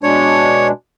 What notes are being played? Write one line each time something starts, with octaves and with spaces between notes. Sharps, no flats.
B2 G#3 D4 C#5